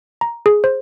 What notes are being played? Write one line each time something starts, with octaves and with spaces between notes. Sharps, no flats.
A#5
G#4
C5